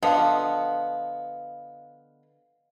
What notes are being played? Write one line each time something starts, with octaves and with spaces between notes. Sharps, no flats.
D3 F3 B3 D#5 F5